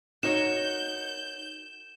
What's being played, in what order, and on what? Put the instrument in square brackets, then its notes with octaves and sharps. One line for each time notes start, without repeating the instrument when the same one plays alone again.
[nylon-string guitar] D#4 [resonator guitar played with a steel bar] F#4 A#4 C#5 [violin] G6 [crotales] E7